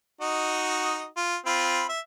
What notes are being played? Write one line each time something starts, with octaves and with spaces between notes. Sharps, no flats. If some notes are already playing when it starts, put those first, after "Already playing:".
D#4 F#4 D#5
F4
C4 F4 B5
E5